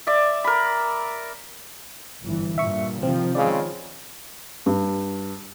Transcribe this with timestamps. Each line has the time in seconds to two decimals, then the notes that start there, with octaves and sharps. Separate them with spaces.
0.07 D5 E5
0.44 A#4 B5
2.24 G1 E3
2.58 G2 A#2 E5 C#6
3.02 C3 D#3 F3 C4
3.35 C#3 G#3 C4 D5 F5
4.66 G2